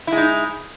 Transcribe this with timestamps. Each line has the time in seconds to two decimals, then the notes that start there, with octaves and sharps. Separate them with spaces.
0.07 E4
0.12 G#3
0.17 D#4